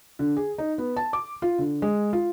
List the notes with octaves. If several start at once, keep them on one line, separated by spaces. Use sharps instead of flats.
D3
G#4
D#4
B3
A5
D6
F4
D3
G#3
F4